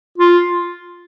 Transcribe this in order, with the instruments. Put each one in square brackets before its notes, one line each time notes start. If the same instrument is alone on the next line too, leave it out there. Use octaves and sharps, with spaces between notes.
[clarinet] F4